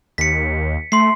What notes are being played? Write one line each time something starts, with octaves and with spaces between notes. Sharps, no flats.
D#2 B6 C#7
A3 C6 C7